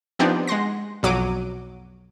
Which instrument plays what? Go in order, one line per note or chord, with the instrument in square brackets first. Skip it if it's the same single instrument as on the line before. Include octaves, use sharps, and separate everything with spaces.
[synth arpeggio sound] F3 B3 C4 D4 D#4 G4
G#3 F#5 C6 A#6
B1 F2 F#3 D6 D#7